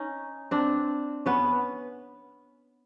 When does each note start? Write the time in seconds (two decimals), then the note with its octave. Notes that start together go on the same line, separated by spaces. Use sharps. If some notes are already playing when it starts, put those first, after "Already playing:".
Already playing: C#4 D#4
0.51 C4 D4
1.26 B3 C#4